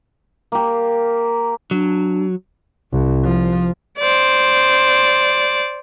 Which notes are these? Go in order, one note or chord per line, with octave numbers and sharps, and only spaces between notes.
A#3 G4
F#3 D4
C2
F3
C5 D5